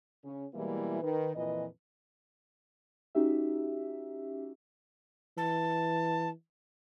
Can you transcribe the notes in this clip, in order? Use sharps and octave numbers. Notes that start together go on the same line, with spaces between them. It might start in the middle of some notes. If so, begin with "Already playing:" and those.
C#3 C#4
B2 E3 G3 G#3 A#3 E4
D#3 B4
F2 A#2 E3 B4 D#5
C#4 D#4 F#4 G4 E5
E3 A5